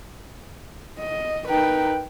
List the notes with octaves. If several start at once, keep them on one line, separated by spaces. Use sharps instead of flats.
D#5
D#4 A#4 B4 G5